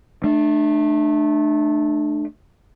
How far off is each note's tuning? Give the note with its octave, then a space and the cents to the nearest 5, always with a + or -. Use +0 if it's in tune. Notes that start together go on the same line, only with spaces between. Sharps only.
A3 -20 D4 +30